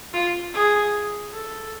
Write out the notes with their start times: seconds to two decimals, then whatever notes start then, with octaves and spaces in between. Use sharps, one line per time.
0.14 F4
0.54 G#4
1.33 A4